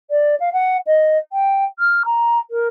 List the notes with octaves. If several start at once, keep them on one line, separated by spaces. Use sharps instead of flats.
D5
F5
F#5
D#5
G5
F6
A#5
A#4